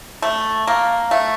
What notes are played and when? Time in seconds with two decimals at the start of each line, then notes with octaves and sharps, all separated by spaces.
0.22 A3
0.67 A#3
1.11 A3